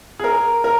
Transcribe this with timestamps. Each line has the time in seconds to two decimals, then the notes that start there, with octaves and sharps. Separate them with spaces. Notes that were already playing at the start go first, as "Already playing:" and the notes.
0.19 G#4
0.24 A#4
0.64 A#4